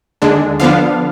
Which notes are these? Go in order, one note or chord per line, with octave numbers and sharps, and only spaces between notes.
D#2 D3 G#3 D4
D3 F3 B3 D4 F5